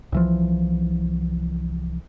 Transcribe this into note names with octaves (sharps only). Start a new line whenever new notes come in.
C2 E3 F3